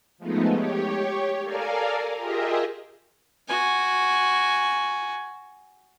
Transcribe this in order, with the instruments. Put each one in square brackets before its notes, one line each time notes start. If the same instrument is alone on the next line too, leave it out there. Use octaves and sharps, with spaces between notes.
[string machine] F3 G#3 A3 B3 D#4
G4 C#5
A4 A#4 D5 F5 G#5 A#5
F4 G4 G#4 A#4 D#5 E5
[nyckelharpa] F#4 G#5